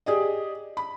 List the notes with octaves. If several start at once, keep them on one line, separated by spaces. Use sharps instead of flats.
G4 G#4 D5 D#5
B5